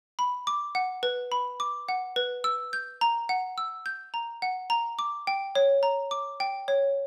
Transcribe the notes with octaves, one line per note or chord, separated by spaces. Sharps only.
B5
D6
F#5
B4
B5
D6
F#5
B4
E6
G6
A#5
F#5
E6
G6
A#5
F#5
A#5
D6
G5
C#5
A#5
D6
G5
C#5